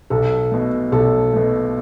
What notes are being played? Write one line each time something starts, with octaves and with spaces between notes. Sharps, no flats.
B1 A4
B2 A3
B1 A4
B2 A3